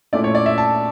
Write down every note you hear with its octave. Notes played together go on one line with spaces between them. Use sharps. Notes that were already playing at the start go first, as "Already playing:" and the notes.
A#2 A3 C#4 E4 D5
C#5
D5
E5
A5